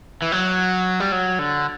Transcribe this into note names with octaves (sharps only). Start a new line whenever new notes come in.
E3
F#3
G3
F#3
D3